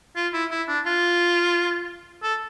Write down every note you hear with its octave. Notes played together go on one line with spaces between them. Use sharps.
F4
E4
E4
D4
F4
A4